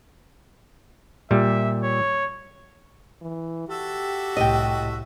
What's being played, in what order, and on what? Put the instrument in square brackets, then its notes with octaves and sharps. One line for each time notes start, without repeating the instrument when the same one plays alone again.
[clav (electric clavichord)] A#2 G3 [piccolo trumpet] E5
[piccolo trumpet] C#5
[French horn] E3
[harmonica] F#4 A4 E5 [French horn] G4
[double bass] C2 A2 [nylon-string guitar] D#5 G5